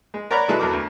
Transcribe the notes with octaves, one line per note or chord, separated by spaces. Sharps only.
G#3
A#4 C#5 D5 F#5 A#5 B5
B2 F#3 G#3 E4 A4 F#6
E2 F#3 A4 A#4 D6
D2